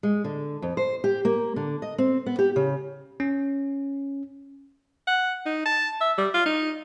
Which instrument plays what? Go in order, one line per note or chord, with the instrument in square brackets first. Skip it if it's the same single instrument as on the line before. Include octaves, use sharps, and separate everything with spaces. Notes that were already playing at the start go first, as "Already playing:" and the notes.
[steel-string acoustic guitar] G#3
D3
F2
C5
G4
A#3
D3
D#5
C4
B3
G4
C#3
[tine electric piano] C#4
[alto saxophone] F#5
D#4
A5
E5
G3
F4
D#4